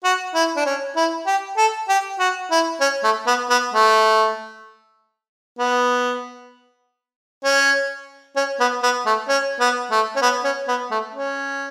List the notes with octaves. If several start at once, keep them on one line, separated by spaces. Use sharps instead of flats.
F#4
E4
D4
C#4
E4
G4
A4
G4
F#4
E4
C#4
A3
B3
B3
A3
B3
C#4
C#4
B3
B3
A3
C#4
B3
A3
C#4
B3
C#4
B3
A3
C#4